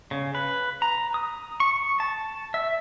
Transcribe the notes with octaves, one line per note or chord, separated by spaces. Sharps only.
C#3
B4
A#5
D#6
C#6
A5
E5